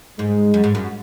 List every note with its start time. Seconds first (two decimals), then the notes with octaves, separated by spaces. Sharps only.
0.19 G#2 G#3
0.54 F#2
0.64 G#2
0.75 F#2